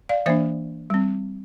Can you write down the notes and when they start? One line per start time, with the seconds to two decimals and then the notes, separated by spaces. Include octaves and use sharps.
0.09 D5 F5
0.26 E3 A#3 D4 C5 E5
0.90 G3 C4